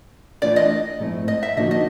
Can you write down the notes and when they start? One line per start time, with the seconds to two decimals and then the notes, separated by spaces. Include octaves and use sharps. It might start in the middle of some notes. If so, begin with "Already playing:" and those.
0.42 E3 A3 D4 F4 D5
0.56 D#5
0.99 G#2 F3 A3 C4 E4
1.28 D#5
1.43 E5
1.57 D3 F3 A#3 D#4 F#4 D#5
1.71 D#5